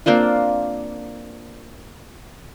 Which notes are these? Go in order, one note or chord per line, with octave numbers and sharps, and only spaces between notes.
A#3 C4 D4 F4